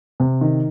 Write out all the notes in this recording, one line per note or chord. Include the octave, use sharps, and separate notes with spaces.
C3
D#3